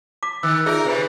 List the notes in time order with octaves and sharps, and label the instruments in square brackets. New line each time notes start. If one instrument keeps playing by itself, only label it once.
[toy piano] D6 [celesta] B6
[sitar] D#3 [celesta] E6 [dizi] F#6
[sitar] D#4 A#4 [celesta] F4 D5 [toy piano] G#4 E5
[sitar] C3 [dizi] B4